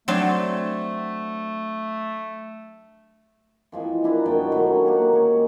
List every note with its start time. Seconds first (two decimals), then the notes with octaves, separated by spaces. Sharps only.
0.08 F#3 A3 C4 D4
3.72 E3 F3 G#3 C4
4.04 D4 E4 A#4 B4
4.26 F#2 B2 G#3 G5
4.52 D#3 F#3 A3
4.86 A#3 G4 F#5
5.13 G#3 C#5